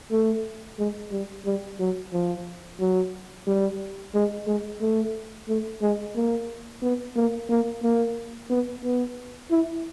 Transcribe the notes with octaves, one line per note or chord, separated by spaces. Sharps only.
A3
G#3
G3
G3
F#3
F3
F#3
G3
G#3
G#3
A3
A3
G#3
A#3
B3
A#3
A#3
A#3
B3
B3
E4